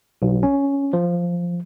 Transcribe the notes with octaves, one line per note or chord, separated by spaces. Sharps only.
B1
C#4
F3